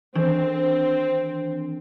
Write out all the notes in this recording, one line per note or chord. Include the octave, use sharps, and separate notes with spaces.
D#3 E3 C4 D4